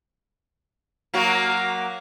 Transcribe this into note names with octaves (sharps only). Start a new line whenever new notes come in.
F#3 A#3 F#4